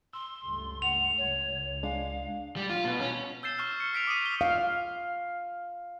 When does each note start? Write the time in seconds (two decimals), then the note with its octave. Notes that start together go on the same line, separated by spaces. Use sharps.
0.13 C6 E6
0.44 C#2 G2 A3
0.82 F#5 F7
1.17 C#2 C#5
1.83 G#3 D4 F5
2.56 G3
2.69 F4
2.85 B2
3.00 C#4
3.43 E6 G6 A6 C7 E7
3.58 C#6 F6
3.80 C#7
3.93 F6 B6 D7 F7
4.07 D6 D#6 D#7
4.21 D#7 G7
4.41 F5